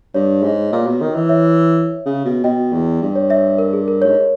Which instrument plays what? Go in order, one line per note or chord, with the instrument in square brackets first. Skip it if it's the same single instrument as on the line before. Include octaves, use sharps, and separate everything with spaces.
[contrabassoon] G2 [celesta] C#5
[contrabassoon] G#2
A#2
B2
D#3
E3
[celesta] C#5 E5
[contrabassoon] C#3
B2
[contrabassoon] B2 [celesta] D#5 G5
[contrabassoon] E2
G2
[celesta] C#5
C#5 E5
A#4
G#4
A#4
[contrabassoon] G#2 [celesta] C#5